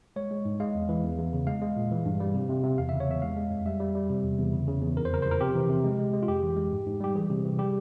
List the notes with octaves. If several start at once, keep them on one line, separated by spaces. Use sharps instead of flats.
G#3 C#5
G#3
G#2
G#3 F5
E2
E3
E2
E2
C#3
G#3 F5
G#3
A#2
E3
G2
G3
C3
C3
C3
E2 F5
C#3 E5
C#5
E2 E5
G#3 F5
G#3
F2
G3 E5
G3
G3
C3
E2
E2
C#3
C#3
E2
F2 A#4
C5
C#3 A#4
F3 C5
A#4
C3 G4
E3
C3
G#3
G#3
G#3
F4
F2 G4
E3
G#3
G#2
G#2
G3 G4
E3 G#4
C3
E3
G3 G4